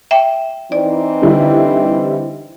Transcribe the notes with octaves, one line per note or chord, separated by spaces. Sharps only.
E5 G5
E3 C4 D#4 D5
D3 G3 E4